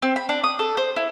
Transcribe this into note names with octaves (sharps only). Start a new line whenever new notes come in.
C4
B5
D4
D#6
A4
C5
E4